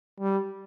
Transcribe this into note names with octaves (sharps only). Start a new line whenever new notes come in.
G3